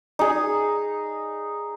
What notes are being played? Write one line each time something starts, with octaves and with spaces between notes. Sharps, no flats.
D#4 G#4